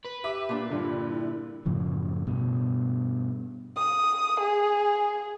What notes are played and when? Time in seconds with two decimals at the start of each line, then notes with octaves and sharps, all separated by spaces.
0.05 B4
0.24 G4 E5 D6
0.49 A#2 D4
0.70 G2 D3 F4
1.10 E4
1.65 F#2 A2 C#3 F3
2.27 G2 B2
3.76 D#6
4.40 G#4